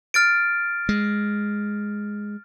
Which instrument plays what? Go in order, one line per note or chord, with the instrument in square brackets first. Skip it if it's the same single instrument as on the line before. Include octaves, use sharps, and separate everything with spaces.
[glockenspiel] F6 A6 D7
[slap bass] G#3